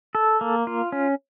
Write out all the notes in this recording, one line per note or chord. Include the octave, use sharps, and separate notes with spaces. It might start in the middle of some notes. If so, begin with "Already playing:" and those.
A4
A#3
F4
C#4